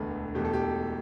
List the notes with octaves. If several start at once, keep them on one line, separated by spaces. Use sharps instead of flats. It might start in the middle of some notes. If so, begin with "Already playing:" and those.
Already playing: E1 D2 D3 A3 B4
E1 E2 B2 A3 G4
A4
G4